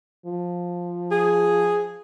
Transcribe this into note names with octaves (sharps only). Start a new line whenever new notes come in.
F3
G#4